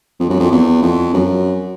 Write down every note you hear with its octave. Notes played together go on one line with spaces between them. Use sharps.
F2
F#2
F2
E2
F2
F#2